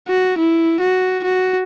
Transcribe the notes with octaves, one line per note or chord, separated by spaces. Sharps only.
F#4
E4
F#4
F#4